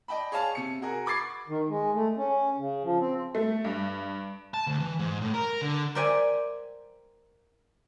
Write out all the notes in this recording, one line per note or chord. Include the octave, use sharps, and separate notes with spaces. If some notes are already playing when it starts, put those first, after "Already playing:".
D5 D#5 G5 A5 B5
G#4 C#5 F5 A5
C3 C#7
F#4 G#4 A#4
B5 C#6 D6 G#6 A6 C7
D#3
G#3
A3
C#4
C#3
F3
C4
A3
G2
A5
D2
E3
G#2
A2
A#4
D3
A#4 C5 D5 E5 G5 G#5